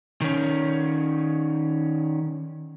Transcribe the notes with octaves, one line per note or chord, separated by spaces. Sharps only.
D#3 C#4